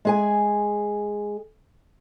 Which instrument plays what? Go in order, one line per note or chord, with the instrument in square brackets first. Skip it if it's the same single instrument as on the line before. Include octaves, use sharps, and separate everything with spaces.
[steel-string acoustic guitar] G#3 G#4 G#5